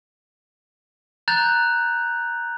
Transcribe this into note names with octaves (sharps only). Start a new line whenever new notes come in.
A#5 F#6 G6 A6 F7